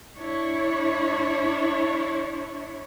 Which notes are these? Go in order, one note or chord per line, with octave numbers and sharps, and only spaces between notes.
D4 E4 C#5